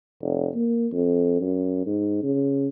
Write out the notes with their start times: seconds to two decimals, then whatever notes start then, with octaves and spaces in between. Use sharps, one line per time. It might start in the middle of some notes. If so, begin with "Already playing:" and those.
0.22 F1
0.55 A#3
0.92 F2
1.41 F#2
1.86 G#2
2.23 C#3